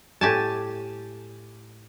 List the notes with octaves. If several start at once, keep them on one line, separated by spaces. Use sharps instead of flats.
A2 G4 G#5 A5